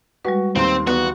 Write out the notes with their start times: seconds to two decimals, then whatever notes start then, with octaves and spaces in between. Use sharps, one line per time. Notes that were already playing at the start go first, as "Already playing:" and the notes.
0.25 G3 G#3 F#4 B4
0.56 D#2 D#3 C4 C6
0.87 E2 B3 F#4